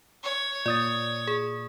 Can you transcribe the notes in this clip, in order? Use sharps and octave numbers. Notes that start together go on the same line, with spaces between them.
C#5
A#2 D5 D#6 A6
G#4